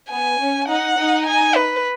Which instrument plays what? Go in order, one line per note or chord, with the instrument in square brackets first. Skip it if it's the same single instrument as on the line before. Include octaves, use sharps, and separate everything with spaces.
[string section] B3 [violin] G#5
[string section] C#4
[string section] D#4 [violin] F#5
[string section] D#4
[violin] G#5
B4